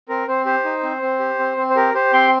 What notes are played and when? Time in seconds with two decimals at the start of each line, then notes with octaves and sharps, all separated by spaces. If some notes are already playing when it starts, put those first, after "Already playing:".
0.09 C4 A#4
0.28 C4 C5
0.45 G4 C5
0.65 D#4
0.83 C4
1.02 C4
1.20 G4
1.39 C4
1.57 C4
1.70 C5
1.76 G4 A#4
1.94 G4 C5
2.13 C4 G5 C6